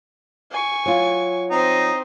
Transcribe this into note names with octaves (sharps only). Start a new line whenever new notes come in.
G#5 C#6
F#3 F4
C4 D#4 C5